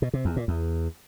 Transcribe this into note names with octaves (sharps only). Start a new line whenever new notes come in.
B2
C3
E2
A#2
E2